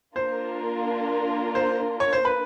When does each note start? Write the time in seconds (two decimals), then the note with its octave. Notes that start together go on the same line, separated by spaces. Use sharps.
0.16 A#3 D4 F4 A#4 C5
1.55 C5
2.00 C#5
2.13 C5
2.25 B4